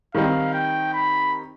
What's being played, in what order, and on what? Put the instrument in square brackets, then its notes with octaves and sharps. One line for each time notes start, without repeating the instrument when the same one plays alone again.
[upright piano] D#3 G3 C4 D#4 [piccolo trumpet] F5
[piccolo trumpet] G5
B5